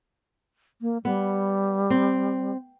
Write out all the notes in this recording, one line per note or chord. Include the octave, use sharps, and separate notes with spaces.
A#3
G3 B3
C4